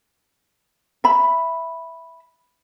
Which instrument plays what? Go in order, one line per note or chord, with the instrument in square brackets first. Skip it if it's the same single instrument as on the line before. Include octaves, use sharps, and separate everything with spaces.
[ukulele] E5 B5